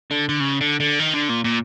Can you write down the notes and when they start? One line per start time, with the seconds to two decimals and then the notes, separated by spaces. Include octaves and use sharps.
0.11 D3
0.29 D3
0.40 C#3
0.61 D3
0.80 D3
1.00 D#3
1.14 D3
1.29 A#2
1.44 A#2